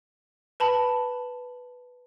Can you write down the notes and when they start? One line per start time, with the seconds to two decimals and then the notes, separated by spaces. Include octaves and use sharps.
0.60 B4 A5 B5